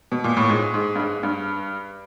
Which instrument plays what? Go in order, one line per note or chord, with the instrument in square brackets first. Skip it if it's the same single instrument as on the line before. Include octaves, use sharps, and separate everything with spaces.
[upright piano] B2
A#2
A2
G#2
G#2
G2
G#2
G2